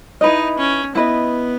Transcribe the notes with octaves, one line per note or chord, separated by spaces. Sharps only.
D#4 E4 B4 D#5
C#4
B3 E4 B4 D#5